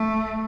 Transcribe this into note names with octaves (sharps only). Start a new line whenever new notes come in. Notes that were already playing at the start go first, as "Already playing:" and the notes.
Already playing: A3